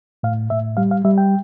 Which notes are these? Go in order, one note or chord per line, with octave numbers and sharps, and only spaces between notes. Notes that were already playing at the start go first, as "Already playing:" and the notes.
A2 F5
A2 E5
G3 F5
F5
G3 E5
G5